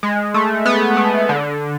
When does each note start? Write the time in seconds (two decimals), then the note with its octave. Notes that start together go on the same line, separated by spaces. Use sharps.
0.03 G#3
0.34 A3
0.66 B3
0.97 A3
1.29 D3